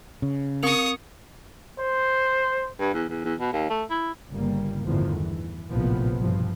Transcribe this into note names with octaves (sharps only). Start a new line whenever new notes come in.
C#3
C4 A#4 C#6 D#6 F7
C5
G2
E2
E2
E2
B2
D#2
A3
E4
G1 C#3 G3 A#3
G1 E2 A2 D3 D#3 F3
E3
F1 A#1 A2 C3 F3 B3
G2 B2 E3 F3